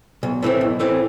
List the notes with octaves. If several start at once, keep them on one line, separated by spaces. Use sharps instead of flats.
B1
A2 E3 A3 C4
B1
A2 E3 A3 C4